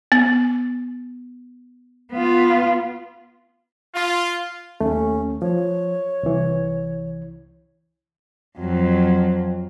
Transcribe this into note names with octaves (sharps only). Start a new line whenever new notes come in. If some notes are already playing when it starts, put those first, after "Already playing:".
B3
B3 F4
F4
D#2 A3 C#4
F3 C#5
C2 E3
F2 F#3